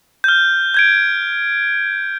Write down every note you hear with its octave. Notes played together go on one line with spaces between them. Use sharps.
F6 G6
G6 G#6 D7